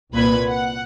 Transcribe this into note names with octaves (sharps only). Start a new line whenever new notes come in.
C2 A#2 B4 B5 G#6
F#5